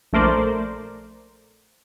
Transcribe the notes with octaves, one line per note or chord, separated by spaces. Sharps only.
A#1 A3 A#4 C5 D5